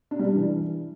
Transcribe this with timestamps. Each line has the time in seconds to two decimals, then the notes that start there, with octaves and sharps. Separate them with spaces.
0.11 D4
0.19 G3
0.27 D4
0.36 E3